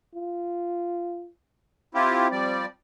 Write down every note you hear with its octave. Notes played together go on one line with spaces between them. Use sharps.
F4
C4 E4 F4 G4
F3 G3 D5